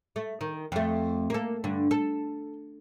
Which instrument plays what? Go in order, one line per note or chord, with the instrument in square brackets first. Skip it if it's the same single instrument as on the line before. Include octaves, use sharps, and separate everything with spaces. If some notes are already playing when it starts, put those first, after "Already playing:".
[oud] A3
D#3
F2 A3
A#3 A4
G2 D3
A4